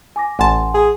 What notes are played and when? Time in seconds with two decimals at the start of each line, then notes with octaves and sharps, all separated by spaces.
0.16 G#5 D6 A#6
0.39 A1 F#5 G#5 A5 C6
0.74 G#4